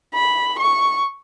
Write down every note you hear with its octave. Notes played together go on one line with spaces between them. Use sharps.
B5
C#6